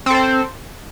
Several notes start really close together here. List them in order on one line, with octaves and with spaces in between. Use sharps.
C4 A4 C5